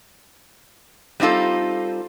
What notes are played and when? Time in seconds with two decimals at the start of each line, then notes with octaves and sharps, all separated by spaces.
1.20 G3 C4 D#4 F4 A4